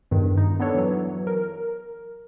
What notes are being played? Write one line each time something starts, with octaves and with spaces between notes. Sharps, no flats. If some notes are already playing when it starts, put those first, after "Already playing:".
E2 G2 D#3
D#4
B3 D4 A4 C#5
E3 F#3
A#4